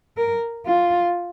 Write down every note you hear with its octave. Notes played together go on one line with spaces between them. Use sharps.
A#4
F4